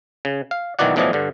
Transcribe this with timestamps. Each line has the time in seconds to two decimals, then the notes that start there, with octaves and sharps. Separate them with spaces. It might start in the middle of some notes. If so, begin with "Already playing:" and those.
0.25 C#3
0.51 F5
0.79 B1 D#3 E3 F#4 D5 F#5
0.96 B1 A2 E3 F3 D5 D#5
1.13 G2 D3